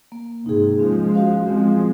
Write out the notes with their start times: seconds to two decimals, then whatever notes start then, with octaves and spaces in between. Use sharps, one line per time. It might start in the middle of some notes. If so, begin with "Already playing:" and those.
0.12 A#3
0.45 G#2 C3 D#4 G#4
0.80 F3 G#3 C#4
1.14 F#4 C5 F5
1.47 F3 G#3 C4